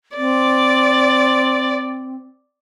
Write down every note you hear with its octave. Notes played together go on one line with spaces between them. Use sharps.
C4 D5